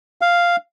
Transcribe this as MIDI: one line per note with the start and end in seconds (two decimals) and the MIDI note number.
0.21 0.56 77